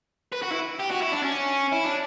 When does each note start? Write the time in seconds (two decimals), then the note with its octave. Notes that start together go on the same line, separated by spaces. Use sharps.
0.32 B4
0.42 F#4
0.51 E4
0.79 G4
0.90 F#4
1.01 E4
1.12 D4
1.23 C#4
1.72 E4
1.84 D4